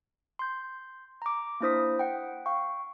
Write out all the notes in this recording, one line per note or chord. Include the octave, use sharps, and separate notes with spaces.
C6 G6
A#5 D6
A#3 D4 E4 C5 D#6 B6
F#5 G5
F5 G5 C#6